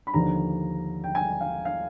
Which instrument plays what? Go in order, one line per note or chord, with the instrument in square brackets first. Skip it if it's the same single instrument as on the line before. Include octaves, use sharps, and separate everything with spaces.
[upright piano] B5
D#2 D3 F3 A#5
G5
G#5
F5
F5